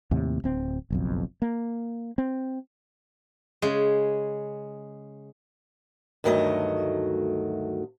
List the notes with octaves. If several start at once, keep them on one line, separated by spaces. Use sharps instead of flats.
D#2 A2 C3
D1 C4
F#1 B1 F2
A#3
C4
C#3 G#3
D2 G2 D#3 F#3 A3 D#5